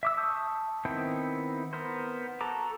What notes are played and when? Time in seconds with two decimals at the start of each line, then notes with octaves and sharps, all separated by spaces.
0.03 E5 D6 E6
0.17 A5 C#6 D#6 G6
0.85 D#3 B3 C4 E4 G5
1.73 B3 A#4 C5
2.41 F#4 A4 A5 A#5 D6